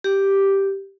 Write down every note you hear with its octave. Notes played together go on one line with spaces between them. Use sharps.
G4